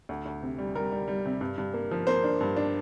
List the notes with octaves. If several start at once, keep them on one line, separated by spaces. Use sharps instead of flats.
D2
D2
C3
G3
G3 A#4
G3
G3
C3
G2
G2
A#3
F3
A#3 C5
D4
G2
D4